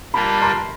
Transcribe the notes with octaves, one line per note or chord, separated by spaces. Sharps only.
G3 A#3 D4 F4 A5 B5
A#5 C6